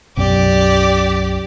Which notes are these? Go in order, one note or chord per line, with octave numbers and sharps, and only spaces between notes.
B1 F#2 G4 D5